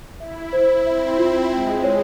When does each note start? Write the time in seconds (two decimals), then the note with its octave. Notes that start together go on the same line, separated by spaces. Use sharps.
0.20 E4 E5
0.53 C5
0.86 C4 E5
1.18 F4
1.52 G#3 G5
1.84 C#5